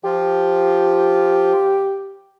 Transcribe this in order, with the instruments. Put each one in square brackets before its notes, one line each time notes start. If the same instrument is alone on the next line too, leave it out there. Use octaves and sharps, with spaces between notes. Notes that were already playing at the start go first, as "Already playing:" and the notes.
[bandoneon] F3 F4 [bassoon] G4